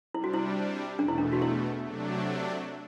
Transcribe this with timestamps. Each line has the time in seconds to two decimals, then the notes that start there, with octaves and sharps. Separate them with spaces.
0.14 C3 G3 D4 E4
0.24 F#4
0.34 E4
0.99 E2 B2 A3 D4
1.08 E4
1.18 D4
1.33 F#4
1.42 E4
1.84 C3 F#3 A3 D4